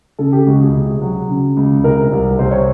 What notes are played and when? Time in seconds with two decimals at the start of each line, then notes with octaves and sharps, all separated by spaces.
0.19 C#3 A4
0.32 G4
0.46 C#2 F#4
0.61 G#4
0.74 C3
1.02 F#3
1.29 C#3
1.57 C#2
1.84 C3 A#4
2.12 C2
2.39 C3 C5
2.51 C#5